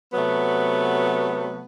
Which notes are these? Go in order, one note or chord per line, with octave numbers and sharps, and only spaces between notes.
C3 F#3 A3 B3